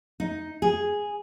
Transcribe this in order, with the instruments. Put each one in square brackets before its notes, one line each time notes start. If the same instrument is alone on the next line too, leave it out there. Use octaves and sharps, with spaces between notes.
[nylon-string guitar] D#4
G#4